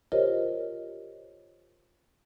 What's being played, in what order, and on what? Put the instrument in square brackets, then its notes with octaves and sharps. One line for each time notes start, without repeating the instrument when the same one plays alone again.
[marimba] F4 G4 A#4 C5 C#5 D#5